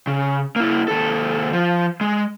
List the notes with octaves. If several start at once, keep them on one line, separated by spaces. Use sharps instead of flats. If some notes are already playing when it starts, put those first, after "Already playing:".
C#3
A#3 E4
D#2 A4
F3
G#3